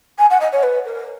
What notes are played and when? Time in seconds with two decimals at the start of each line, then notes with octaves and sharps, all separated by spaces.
0.18 G#5
0.30 F#5
0.40 D#5
0.52 C#5
0.63 B4
0.85 A#4